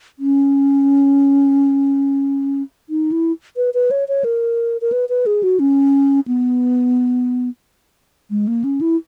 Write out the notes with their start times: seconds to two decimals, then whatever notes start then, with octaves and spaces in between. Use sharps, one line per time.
0.19 C#4
2.89 D#4
3.12 E4
3.57 B4
3.74 B4
3.91 C#5
4.08 C#5
4.24 A#4
4.81 A#4
4.92 B4
5.09 B4
5.26 G#4
5.43 F#4
5.59 C#4
6.28 B3
8.30 G#3
8.48 A#3
8.64 C#4
8.81 E4